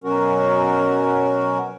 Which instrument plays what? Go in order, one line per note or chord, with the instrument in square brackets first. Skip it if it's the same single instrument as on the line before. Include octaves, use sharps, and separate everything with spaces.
[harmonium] B2 F#3 C#4 F#4 A#4